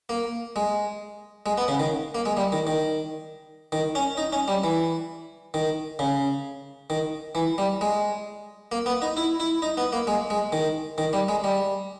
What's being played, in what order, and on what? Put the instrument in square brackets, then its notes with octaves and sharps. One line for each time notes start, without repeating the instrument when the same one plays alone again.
[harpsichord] A#3
G#3
G#3
B3
C#3
D#3
A#3
G#3
G3
D#3
D#3
D#3
C#4
D#4
C#4
G3
E3
D#3
C#3
D#3
E3
G3
G#3
A#3
B3
D#4
E4
E4
D#4
B3
A#3
G#3
G#3
D#3
D#3
G3
G#3
G3